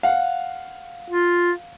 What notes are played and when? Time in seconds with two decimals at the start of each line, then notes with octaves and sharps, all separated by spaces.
0.03 F5 F#5
1.10 F4